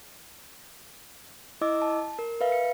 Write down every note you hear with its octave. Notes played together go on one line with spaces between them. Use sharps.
E4 D#5 D6 E6
A5
A#4
B4 E5 F5
C#7